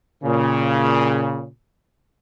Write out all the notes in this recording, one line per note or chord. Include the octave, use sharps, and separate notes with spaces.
A#2 C#3